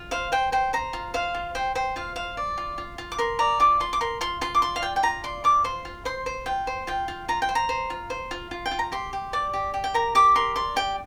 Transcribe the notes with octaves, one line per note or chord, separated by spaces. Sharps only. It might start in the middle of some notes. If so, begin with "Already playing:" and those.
Already playing: F4
C5 F5
C5 G5
C5 G5
C5 A#5
F4
C5 F5
F4
C5 G5
C5 G5
F4 F5
C5 F5
D5
F4
F4
F4
D6
A#4 C6
D5 A#5
F4 D6
F4 C6
D6
A#4 C6
F4 C6
F4 C6
D6
D5 C6
F5
F4 G5
G5
F4 A#5
D5 C6
F4 D6
C5 C6
F4
C5 C6
C5
F4 G5
C5
F4 G5
F4
F4 A#5
G5
C5
A#5
C5
F4
C5
F4
F4
G5
F4
A#5
G4 C6
G4
D5 D6
G4
G4
G5
A#4 A#5
G4 D6
A#4 C6
D5 C6
G4 G5